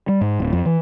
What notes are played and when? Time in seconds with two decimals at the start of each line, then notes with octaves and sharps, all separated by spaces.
0.08 G3
0.21 G#2
0.40 D1
0.53 F2
0.65 E3